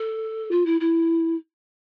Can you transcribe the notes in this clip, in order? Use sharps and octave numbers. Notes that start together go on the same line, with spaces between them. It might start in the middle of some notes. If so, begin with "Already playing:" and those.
Already playing: A4
F4
E4
E4